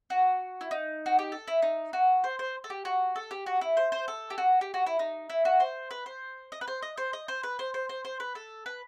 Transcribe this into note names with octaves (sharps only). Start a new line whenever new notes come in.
F#4
E4
D#4
F#4
G4
A4
E4
D#4
F#4
C5
C5
A4
G4
F#4
A4
G4
F#4
E4
C5
C5
A4
G4
F#4
G4
F#4
E4
D#4
E4
F#4
C5
B4
C5
D#5
B4
C5
D#5
C5
D#5
C5
B4
C5
C5
C5
C5
B4
A4
B4